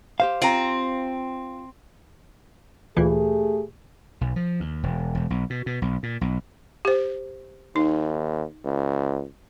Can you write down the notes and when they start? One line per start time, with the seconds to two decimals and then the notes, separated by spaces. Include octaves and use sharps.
0.20 G4 C5 F5
0.42 C4 F4 A#5
2.97 D2 A#2 E3 A3 G4 G#4
4.21 B1
4.36 F3
4.60 D#2
4.83 E1
5.15 E1
5.30 B1
5.50 B2
5.66 B2
5.82 B1
6.03 A#2
6.21 B1
6.85 G4 C5
7.76 D#2 D#4
8.65 C#2